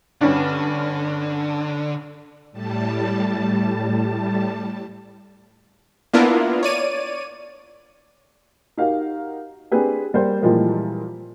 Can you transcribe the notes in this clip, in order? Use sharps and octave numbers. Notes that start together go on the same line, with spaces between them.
G2 D3 C#4 D4
A2 G3 A5
A#3 B3 D4 E4 F4 A#4
C#5 D5 D#7
D#4 F#4 G4 A#4 F5
C4 D4 G4 G#4 B4
G3 A#3 C5 D5
A#2 E3 F3 G3 G#3 A#3